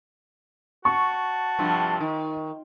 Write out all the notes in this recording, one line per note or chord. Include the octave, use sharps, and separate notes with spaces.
F#4 A5 C#6
G2 C3 F3
D#3